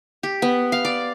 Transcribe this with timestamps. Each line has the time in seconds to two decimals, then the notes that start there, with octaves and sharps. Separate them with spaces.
0.23 G4
0.42 B3
0.72 F5
0.85 D5